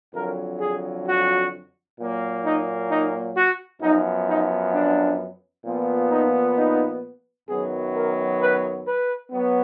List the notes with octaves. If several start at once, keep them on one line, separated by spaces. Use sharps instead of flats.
F2 D3 F#3 A#4
G#4
F#4
A#2 F#3 A#3
D#4
D#4
F#4
F#2 F3 B3 D#4
D#4
D4
A#2 F3 B3
D#4
D#4
F#2 D#3 F#3 B3 G#4
A#4
B4
B4
F#3 B3